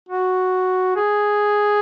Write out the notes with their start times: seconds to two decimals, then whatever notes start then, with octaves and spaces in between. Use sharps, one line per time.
0.09 F#4
0.96 G#4